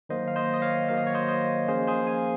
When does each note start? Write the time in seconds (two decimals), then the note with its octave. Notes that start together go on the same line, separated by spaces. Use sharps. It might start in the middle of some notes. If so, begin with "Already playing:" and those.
0.09 D#3 F#3 A#3 C5 D#5
0.28 F5
0.36 C5 D#5
0.54 D#5
0.62 C#5 F5
0.88 D#3 F#3 A#3 F5
0.97 D#5
1.07 C#5
1.15 C5 D#5
1.28 C5 D#5
1.68 F3 A#3 C#4 G#4 C5
1.87 G#4 C5
2.07 F5 G#5